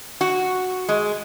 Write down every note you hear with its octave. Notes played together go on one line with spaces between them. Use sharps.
F#4
G#3